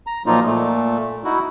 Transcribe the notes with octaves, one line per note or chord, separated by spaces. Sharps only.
A#5
A#2 F3 F#3 A#3 D#4 F4
A#2 A3
D#4 E4 F#4